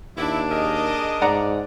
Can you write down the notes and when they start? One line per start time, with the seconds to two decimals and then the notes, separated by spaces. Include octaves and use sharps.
0.17 D#2 D4 E4
0.50 G#4 A#4 D#5
1.21 G#2 D5 F#5 A#5